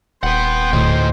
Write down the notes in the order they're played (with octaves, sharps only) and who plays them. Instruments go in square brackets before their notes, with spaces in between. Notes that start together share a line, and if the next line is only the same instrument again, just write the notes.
[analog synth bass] D#1 [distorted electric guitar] B4 F#5 [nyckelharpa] G5 C6
[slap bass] D2 A2 [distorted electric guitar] D#4 C5